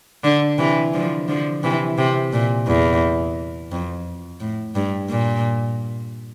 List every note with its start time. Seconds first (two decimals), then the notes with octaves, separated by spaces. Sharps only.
0.24 D3
0.58 C3 E3
0.94 D3 F3
1.28 D3 F3
1.64 C3 E3
1.98 C3
2.33 A#2
2.68 E2
3.72 F2
4.41 A2
4.75 G2
5.10 A#2